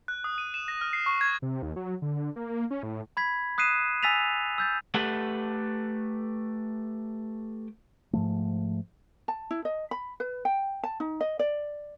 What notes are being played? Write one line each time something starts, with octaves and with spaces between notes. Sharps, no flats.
F#6
D#6
D#7
E7
A#6
F6
C7
C#6
G#6
C3
D#2
F#3
D3
A#3
C#4
A2
B5 G#6 B6
D#6 F#6 B6 C7 D#7 E7
G#5 E6 A6 B6 D#7 F7
E6 G6 A6
A3 G4 A4 B4 F#5
G#2 F3 A3
A5
E4
D#5
B5
B4
G5
A5
D#4
D#5
D5